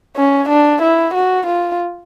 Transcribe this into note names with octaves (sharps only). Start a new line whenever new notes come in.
C#4
D4
E4
F#4
F4